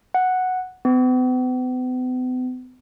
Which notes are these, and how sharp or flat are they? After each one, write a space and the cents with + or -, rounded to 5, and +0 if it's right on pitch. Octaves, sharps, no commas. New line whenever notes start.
F#5 +0
B3 +45